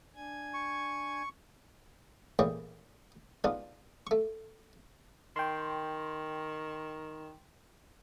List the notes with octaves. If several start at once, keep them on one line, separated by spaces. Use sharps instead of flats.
D4 G#5 G#6
C#6
A1 A#2 E3 G#4 C#5 G5
G#3 B3 D4 D#4 F4
A3 C#6
D#3 G5 C6